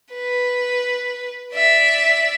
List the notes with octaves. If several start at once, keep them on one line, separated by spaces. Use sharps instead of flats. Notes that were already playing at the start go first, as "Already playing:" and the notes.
B4
D5 E5